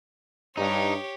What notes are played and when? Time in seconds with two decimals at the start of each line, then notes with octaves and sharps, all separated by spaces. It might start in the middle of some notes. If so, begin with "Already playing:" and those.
0.57 G2 D#4 G4 C#5